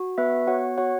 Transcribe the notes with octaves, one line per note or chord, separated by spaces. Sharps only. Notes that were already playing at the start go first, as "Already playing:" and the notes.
Already playing: F#4
B3 B4 E5
F#4 C#5 F#5
F#4 C#5 F#5